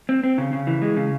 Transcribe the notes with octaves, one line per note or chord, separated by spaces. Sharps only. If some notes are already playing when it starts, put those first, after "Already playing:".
C4
C4
C#3
C#3
E3
G#3
C#3